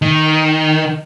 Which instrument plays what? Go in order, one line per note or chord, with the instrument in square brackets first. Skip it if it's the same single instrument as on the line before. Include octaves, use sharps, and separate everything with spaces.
[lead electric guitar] D#3